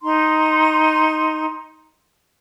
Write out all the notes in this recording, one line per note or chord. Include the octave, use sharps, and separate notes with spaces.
D#4 A#5 C6